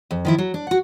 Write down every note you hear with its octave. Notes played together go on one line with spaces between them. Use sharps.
F2
D#3 F3 E4
F#3
D4
F#4 F#5